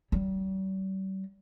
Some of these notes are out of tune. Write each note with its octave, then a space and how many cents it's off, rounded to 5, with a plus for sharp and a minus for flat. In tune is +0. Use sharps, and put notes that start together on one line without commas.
G3 -40